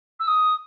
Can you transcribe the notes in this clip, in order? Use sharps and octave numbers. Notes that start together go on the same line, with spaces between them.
E6
D#6